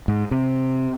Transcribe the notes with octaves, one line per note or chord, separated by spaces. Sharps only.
G#2
C3